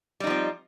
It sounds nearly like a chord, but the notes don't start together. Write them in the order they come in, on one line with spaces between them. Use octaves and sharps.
G3 D#4 F3 C4